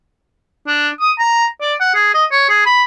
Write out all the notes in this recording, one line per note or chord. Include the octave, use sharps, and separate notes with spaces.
D4
D#6
A#5
D5
F#5
G#4
D#5
C#5
G#4
B5